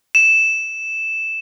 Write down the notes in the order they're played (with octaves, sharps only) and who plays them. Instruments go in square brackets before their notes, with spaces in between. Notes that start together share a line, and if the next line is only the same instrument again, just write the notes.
[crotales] E7